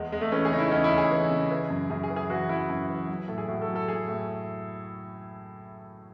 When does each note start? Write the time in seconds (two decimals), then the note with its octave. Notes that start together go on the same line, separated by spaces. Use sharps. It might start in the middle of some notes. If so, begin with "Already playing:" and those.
Already playing: E2 G#3
0.12 E2 G#3
0.21 A3
0.32 E3 C#4
0.45 G#4
0.51 C#3 D#4
0.58 E4
0.71 E2 C#4
0.84 E4
0.91 E2
0.98 G#4
1.11 E3
1.31 C#3
1.51 E3
1.70 F#2
1.90 F#2 G#4
2.03 G#4
2.10 E3
2.16 G#4
2.30 E3 F#4
2.49 F#2 E4
2.69 F#2
2.89 E3
3.09 F#3
3.28 A2 A4
3.38 G#4
3.48 A2 F#4
3.62 A4
3.68 F#3
3.76 A4
3.88 F#3 G#4
4.08 A2